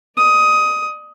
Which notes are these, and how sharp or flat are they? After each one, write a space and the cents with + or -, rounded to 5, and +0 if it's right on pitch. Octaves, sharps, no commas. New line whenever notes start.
D5 +35 D#6 +15